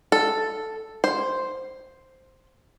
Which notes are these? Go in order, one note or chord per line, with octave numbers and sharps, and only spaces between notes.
A4
C5